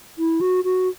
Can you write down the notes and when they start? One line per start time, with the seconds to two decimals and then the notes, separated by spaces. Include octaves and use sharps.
0.18 E4
0.41 F#4
0.64 F#4